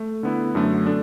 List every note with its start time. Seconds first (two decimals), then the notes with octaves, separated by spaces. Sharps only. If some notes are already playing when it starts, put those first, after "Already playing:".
Already playing: A3
0.23 D3 B3 E4
0.55 F#2 D3 A3
0.86 A3 D4